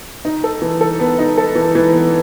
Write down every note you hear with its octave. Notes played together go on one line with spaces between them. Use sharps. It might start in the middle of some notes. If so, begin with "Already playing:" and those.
D#4
A4
E3
A4
B3
D#4
A4
E3
E3
B3